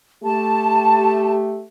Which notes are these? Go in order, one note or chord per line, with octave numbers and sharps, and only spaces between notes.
A3 G4 A5